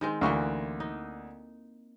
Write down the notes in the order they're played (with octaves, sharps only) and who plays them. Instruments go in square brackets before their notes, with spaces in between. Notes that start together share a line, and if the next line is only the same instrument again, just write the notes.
[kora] D#3 G#3 C4
[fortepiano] D2 C#6 [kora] E3 A#3 C4
[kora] D#4